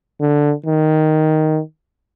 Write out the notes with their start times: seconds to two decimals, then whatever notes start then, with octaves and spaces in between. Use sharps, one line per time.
0.21 D3
0.66 D#3